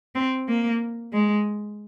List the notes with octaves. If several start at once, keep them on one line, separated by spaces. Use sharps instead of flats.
C4
A#3
G#3